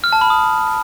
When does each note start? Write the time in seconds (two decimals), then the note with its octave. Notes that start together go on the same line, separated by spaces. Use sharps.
0.04 F6
0.12 A5
0.21 B5
0.30 D#6